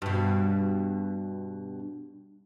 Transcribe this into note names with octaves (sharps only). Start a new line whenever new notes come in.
G2 B2